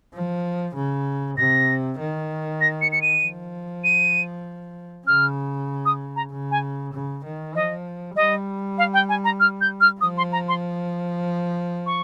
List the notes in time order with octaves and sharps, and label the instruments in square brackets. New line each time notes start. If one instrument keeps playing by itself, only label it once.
[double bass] F3
C#3
[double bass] C3 [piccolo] A#6
[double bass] D#3
[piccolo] A#6
C#7
C#7
D#7
[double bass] F3
[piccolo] D#7
[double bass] C#3 [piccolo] F6
[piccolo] D#6
A#5
[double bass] C#3
[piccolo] G#5
[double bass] C#3
D#3
[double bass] F3 [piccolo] D#5
[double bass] G3 [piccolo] D#5
[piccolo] F5
G5
G#5
A#5
F6
G6
F6
[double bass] F3 [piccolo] D#6
[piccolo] C6
A#5
C6
C#6